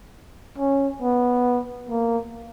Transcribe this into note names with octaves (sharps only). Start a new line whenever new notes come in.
C#4
B3
A#3